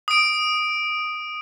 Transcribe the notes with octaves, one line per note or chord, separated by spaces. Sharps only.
D#6 D7